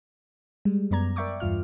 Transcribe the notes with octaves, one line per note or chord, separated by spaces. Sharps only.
G3 G#3
F#2 B3 D5 A#5 G#6
A#4 D5 E5 G5 C#6 D6
E2 G2 F4 F6